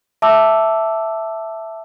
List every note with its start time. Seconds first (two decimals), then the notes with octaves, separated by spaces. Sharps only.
0.22 E5 A5 D6 E6